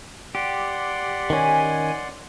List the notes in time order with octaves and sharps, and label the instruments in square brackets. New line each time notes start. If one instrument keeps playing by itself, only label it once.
[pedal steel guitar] G4 [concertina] D5 F#5 C6
[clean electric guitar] D#3 C#4 [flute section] G#5